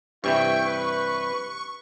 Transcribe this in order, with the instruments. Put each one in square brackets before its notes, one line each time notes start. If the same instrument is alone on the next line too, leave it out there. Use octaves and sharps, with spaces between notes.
[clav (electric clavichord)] G2 C3 E3 [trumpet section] E4 G5 [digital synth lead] C#6
[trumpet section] B4